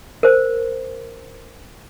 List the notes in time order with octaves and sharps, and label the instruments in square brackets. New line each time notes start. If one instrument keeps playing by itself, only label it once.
[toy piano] A#4 C5